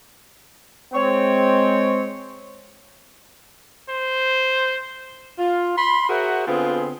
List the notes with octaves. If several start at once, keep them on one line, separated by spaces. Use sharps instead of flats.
G#3 C4 C#5
C5
F4
B5 C6
F#4 G#4 A#4 C5 E5 F#5
D3 B3 C4 F4 G#4